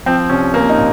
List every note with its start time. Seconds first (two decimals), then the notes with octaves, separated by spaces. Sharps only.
0.06 F3 C4
0.30 C2 C#4
0.54 C2 A#3
0.69 D#4
0.78 A#2